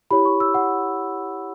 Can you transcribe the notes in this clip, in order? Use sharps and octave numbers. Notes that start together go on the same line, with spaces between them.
E4 G4 C#5 B5
C#6
E6
F#5